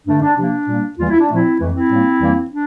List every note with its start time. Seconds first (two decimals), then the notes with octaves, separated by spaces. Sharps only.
0.07 G2 D3 A3 D4
0.22 D4
0.37 C3 F3 A#3 D4
0.68 A#2 G3 A#3
0.98 E2 E3 G3 A#3 F4
1.09 E4
1.20 D4
1.28 A#2 F3 A3 C4 E4
1.59 F2 E3 A3
1.74 C4 E4
1.90 A2 G3 A#3
2.20 F2 E3 G3 A#3
2.51 D4